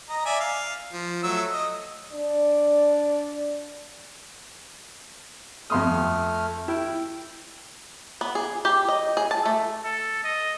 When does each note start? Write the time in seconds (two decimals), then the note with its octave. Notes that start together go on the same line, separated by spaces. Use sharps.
0.09 D#5 A#5
0.25 D5 E5 G#5
0.40 F5
0.92 F3
1.23 F#3 A3 E6
1.52 D#5
2.12 D4 D5
5.70 F2 A3 C6 D#6 F6
6.68 E4 G5
8.21 B3
8.35 G#4
8.65 G4
8.88 D#5
9.17 G#4
9.31 A5
9.46 A3
9.84 A4
10.24 D#5